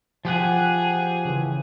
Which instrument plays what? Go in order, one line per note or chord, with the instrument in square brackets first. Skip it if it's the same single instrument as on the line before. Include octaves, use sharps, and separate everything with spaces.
[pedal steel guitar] F3 G4 F#5 [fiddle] G#4
[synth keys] C#3 E3